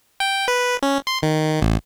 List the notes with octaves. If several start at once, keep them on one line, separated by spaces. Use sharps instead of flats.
G5
B4
C#4
C6
D#3
A1